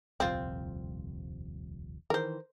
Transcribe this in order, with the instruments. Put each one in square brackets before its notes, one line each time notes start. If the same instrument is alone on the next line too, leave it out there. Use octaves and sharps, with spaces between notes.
[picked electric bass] D#1 C2 F2 [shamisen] C4 F4
[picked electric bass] D#3 E3 [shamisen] A#4 C5